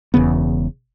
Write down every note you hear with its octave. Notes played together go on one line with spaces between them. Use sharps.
E1 E2 C#3 B3